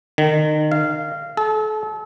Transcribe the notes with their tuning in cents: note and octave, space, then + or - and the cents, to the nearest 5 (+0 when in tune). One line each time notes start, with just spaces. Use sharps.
D#3 -30
F5 -15
A4 -35